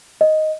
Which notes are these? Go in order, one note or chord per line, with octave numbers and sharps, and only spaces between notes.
D#5